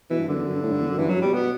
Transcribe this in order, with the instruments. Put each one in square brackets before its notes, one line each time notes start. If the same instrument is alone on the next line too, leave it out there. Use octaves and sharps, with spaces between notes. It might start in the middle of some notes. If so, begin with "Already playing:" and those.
[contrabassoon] B2 [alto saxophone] E3
[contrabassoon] G2
[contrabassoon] F#2 [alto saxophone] D3
[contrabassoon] E2
F#2
G2
A2
G2
E2
F#2
[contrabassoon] G2 [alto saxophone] E3
[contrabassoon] F#2 [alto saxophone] F#3
[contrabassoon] G2
[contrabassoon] B2 [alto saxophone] G3
[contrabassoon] B2 [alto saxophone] B3